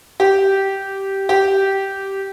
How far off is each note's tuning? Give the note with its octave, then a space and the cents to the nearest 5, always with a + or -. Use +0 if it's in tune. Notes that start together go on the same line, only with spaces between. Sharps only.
G4 -10
G4 -10